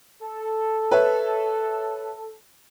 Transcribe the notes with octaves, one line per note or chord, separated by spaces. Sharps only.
A4
B4 C#5 E5